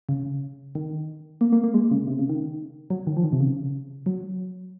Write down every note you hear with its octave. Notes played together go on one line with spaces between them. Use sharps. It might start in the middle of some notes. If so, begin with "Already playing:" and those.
C#3
D#3
A#3
A#3
A#3
G#3
C#3
C3
C#3
D#3
F#3
D#3
F3
D#3
C3
C#3
F#3